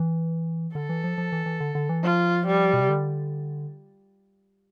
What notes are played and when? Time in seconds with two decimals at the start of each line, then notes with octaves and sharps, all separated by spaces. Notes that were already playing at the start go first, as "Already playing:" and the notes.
Already playing: E3
0.75 D3 A4
0.89 E3
1.04 F3
1.18 F3
1.32 E3
1.46 E3
1.60 D3
1.75 D3
1.89 E3
2.03 F3 F4
2.47 G3
2.73 B2
2.81 C3
2.89 D3